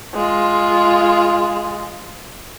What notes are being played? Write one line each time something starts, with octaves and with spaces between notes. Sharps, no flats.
G#3 F4